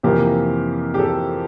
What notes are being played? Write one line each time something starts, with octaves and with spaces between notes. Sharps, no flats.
F2 C3 E3 A#3 G4
G4
A4